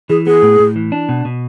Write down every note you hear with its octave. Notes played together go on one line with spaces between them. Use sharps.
E3 G#4
B3 G#4
A2
A2
E3
D4
B2
B2